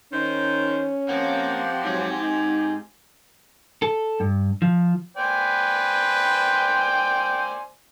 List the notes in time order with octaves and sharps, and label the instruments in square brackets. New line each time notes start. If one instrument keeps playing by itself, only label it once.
[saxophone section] D#3 D#4 C5 [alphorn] C#4
[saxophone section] F3 F#5 [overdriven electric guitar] A#3 [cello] C4 G4
[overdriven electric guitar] G#2 G#4 [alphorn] F#3
[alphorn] D#4
[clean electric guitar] A4
G2
F3
[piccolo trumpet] B4 [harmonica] C5 D5 G#5 [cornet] G5